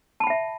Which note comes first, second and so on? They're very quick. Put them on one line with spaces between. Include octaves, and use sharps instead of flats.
A5 B5 G5 E5